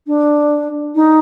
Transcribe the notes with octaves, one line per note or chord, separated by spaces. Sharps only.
D4
D#4